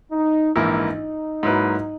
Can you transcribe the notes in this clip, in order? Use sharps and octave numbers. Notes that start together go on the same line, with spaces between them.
D#4
A#1 G#2 E3 A#3 D#4 E4
G#2 F#3 A#3 E4 B4